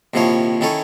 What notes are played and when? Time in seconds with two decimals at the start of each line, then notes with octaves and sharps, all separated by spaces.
0.14 A#1 C3 D#3 F3 E4 C#5
0.61 D#3 C#4 E4 A4 C#5